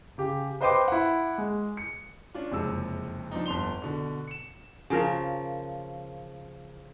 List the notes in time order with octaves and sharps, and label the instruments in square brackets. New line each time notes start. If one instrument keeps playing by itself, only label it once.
[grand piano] C#3 G4
B4 C5 D#5 G5 C6 D6
E4 F#5
G#3
C#7
C#4 D4 F4
F#1 F2 C3 G#3 E6
F3 C4 D4 D#4
G1 F2 C6 F7 G7
B2 D3
C#7 E7
[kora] C#3 F3 A#4